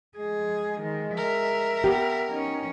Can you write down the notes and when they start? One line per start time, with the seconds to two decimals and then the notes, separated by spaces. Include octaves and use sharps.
0.17 G#3 G#4
0.81 D#3
1.17 A#4 E5
1.84 B3 G4
2.32 C#4 D#4